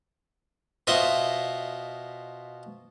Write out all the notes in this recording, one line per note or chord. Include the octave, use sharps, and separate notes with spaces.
B2 F4 C5 D#5 E5